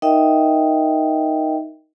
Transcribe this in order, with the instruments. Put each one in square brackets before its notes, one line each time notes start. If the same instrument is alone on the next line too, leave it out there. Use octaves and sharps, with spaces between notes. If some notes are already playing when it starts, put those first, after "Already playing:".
[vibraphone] D#4 A#4 D#5 E5 G5